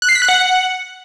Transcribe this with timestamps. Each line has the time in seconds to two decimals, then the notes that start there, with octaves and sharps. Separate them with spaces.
0.02 F#6
0.09 C7
0.15 B6
0.22 F#6
0.28 F#5